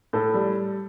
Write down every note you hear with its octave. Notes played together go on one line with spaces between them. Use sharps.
A2 A4
G3